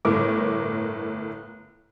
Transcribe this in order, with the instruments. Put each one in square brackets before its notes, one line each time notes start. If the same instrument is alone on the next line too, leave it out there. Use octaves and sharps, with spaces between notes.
[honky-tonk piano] G1 A2 A#4 D6